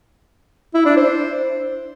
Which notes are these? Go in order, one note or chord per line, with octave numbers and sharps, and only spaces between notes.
E4
D4
C5